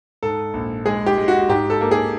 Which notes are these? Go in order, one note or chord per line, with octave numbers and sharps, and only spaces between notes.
G#2 A4
A#1
G#3 G#4
G4
G#3
F#4
G#2 G4
A4
A#3
G#4